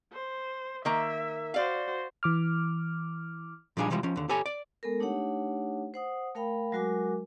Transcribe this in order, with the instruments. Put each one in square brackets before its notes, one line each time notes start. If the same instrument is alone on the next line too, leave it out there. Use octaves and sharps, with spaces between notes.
[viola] C5
[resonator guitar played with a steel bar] D#3 A#3 [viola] E5
[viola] F#4 C5 [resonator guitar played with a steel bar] D5 F5
[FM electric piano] E3 D6 F6
[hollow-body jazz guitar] A#2 F3 G3 D4 D#4 G#4
C3 E3 F3 G3 G#3
F3 C#4
D#2 D3
G4 A4 C#5 G#5
D5
[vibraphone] G#3 B3 A4 A#4
A3 D4 D#4 G4 C#5 F#5
C5 F#5 D#6
A3 A#4 F5 G5 B5
F#3 G#3 F#4 A#4 G#5 D6